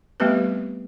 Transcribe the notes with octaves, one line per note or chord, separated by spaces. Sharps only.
G3 A3 B3 C4 G4 B4